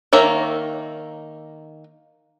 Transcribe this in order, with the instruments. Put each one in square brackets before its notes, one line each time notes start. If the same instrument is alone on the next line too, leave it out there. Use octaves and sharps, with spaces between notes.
[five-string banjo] D#3 A#3 C#5 E5 A#5